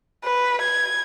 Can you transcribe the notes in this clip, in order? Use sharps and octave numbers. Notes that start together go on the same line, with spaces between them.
B4
G#6